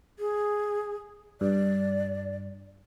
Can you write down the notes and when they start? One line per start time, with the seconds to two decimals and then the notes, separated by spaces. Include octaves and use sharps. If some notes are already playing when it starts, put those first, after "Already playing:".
0.19 G#4
1.41 G2 D5